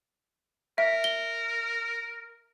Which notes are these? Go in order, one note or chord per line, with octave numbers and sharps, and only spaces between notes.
A#4 E5
G7